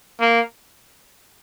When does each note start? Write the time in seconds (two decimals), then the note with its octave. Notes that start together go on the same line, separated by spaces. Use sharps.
0.20 A#3